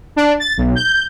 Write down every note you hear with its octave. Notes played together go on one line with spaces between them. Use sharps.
D4
A6
B1
G6